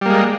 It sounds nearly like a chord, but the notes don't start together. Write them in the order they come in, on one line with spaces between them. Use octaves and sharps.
G3 A#3 G#3